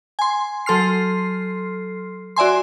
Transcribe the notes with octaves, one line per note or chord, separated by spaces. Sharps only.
G#5 C6
F#3 A4 C6 F6 C7
F#4 D5 E5 G#5 C6